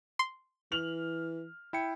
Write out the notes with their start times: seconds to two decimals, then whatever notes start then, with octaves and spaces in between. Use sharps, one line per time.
0.19 C6
0.72 E3 F6 F7 F#7
1.73 E4 G5 C#7